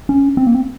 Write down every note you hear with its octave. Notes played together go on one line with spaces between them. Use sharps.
C#4
C4
A#3
C4